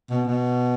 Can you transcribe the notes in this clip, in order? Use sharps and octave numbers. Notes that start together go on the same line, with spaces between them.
B2
B2